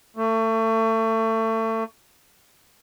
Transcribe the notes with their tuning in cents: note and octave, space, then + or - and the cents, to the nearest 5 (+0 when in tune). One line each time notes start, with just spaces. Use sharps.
A3 +30